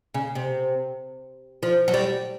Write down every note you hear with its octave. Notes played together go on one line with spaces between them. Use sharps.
C#3
C3
F3
F#3
G3